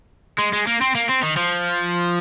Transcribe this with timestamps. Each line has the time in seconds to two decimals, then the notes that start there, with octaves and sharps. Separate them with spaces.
0.38 G#3
0.53 G#3
0.67 A#3
0.81 C4
0.95 A#3
1.09 C4
1.23 D#3
1.37 F3